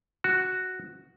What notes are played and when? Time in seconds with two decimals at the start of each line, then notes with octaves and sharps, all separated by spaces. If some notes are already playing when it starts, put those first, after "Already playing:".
0.24 F#4